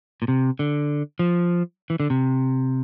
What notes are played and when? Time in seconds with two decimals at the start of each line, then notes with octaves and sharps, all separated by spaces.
0.22 A#2
0.28 C3
0.59 D3
1.19 F3
1.90 E3
2.00 D3
2.10 C3